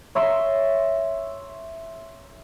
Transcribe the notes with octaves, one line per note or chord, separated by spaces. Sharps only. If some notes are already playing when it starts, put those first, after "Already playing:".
C#5 E5 C6